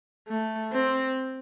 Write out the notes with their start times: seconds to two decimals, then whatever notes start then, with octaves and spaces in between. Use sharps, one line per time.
0.28 A3
0.72 C4